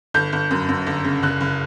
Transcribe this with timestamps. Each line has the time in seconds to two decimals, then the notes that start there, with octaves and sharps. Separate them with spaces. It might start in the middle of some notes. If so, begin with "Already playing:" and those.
0.14 G1 G6
0.33 G1
0.51 F#2
0.69 F#2
0.87 G1
1.05 C#3
1.22 F#1 F#6
1.41 F#1